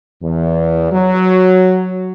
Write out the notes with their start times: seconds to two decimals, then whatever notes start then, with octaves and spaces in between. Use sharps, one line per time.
0.22 E2
0.92 F#3